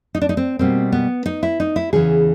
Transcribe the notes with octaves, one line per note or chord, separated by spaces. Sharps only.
D#4
D4
D#4
C4
B2 G3 A#3 C4
B3
D#4
E4
D#4
E4
E2 C#3 E3 G#4